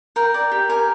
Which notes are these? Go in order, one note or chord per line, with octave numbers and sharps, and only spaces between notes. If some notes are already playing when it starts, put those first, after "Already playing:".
A#4 G5
D5
G4
A#4 G#5